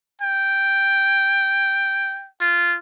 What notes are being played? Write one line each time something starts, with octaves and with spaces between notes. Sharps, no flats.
G5
F4